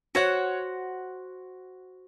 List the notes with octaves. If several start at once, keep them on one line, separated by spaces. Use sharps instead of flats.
F#4 C5 C#5 F#5